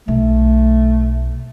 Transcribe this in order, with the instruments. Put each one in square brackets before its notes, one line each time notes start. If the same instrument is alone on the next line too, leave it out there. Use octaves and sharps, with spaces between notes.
[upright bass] B1 [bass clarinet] A3